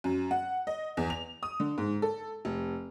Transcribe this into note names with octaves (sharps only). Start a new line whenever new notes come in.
F#2
F#5
D#5
E2
F7
D#6
D3
G#2
A4
F1